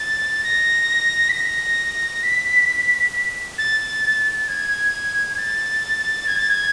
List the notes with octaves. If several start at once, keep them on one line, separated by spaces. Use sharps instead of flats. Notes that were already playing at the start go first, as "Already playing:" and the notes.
Already playing: A6
A#6
B6
A#6
B6
A6
G#6
A6
G#6
A6
G#6